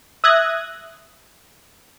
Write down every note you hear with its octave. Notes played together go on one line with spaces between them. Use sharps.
E5 D#6 F#6 G#6 A#6